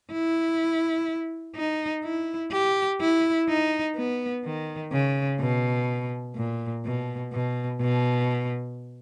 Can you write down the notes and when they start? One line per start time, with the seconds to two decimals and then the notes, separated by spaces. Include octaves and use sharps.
0.11 E4
1.56 D#4
2.04 E4
2.52 G4
3.01 E4
3.49 D#4
3.96 B3
4.45 D#3
4.92 C#3
5.40 B2
6.36 A#2
6.85 B2
7.32 B2
7.81 B2